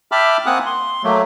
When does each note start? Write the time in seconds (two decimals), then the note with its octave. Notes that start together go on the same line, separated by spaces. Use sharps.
0.12 E5 G5 A5 B5 D6 F6
0.46 A#3 C4 F#5 G#5 D#6 F#6
0.66 C6
1.04 F#3 A3 A#3